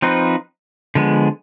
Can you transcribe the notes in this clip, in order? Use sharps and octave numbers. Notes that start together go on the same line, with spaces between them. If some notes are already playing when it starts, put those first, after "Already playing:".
F3 C4 D#4 B4
D3 F3 G#3 B3